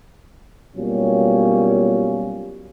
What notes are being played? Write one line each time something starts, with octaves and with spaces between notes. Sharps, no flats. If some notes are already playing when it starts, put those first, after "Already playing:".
B2 F#3 G3 A#3 C#4 F4